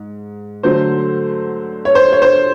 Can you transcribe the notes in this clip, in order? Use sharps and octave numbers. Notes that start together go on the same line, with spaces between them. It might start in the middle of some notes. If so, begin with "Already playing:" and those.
Already playing: G#2
D3 F#3 A3 C5
C#5
C5
C#5
C5